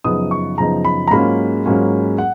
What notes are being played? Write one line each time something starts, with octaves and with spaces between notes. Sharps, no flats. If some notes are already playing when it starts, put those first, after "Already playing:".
F#2 C#3 F3 B3 D#4 D#6
C#6
F#2 C#3 F3 B3 D#4 A#5
B5
A#5
G#2 F#3 A#3 C#4 F4 B5
G#2 F#3 A#3 C#4 F4
F#5